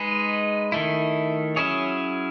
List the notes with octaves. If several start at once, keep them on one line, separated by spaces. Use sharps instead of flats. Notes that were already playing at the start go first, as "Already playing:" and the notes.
Already playing: G#3 D#4 G#4 B4
D#3 A3 E4
F#3 C#4 E4 G#4 C#5